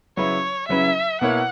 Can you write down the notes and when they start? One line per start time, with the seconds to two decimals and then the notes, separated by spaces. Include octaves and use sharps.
0.17 C#3 F#3 C#4 E4 B4 C#5
0.68 C#3 F#3 C#4 E4 B4 E5
1.21 B2 A#3 E4 A#4 C#5 F#5